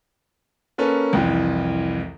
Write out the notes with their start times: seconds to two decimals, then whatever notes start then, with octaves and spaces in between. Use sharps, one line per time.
0.78 A#3 C#4 A4 B4
1.13 C2 F2 E3